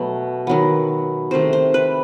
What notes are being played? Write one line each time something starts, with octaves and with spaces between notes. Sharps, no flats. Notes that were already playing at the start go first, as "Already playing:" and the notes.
Already playing: B2 F#3 A3
D#3 F#3 B3
C3 D#3 A3 C5
C5
B4